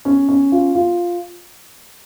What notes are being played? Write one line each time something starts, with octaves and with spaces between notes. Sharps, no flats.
C#4
C#4
F4
F4